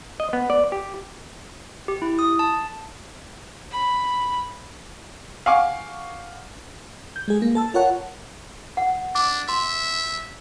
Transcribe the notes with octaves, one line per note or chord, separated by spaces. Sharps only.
D#5
B3
D5
G4
G4
E4
D#6
A5
B5
F5 F#5 G#5 C#6 D6
G6
G#3 G#4
A#3
A4 A5 E6
F4 A#4 C#5 F#5 A5
F#5
D4 D6
E5 C6